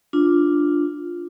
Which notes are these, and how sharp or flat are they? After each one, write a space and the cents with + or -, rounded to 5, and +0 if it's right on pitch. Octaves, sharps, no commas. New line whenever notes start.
D4 +0 F4 +0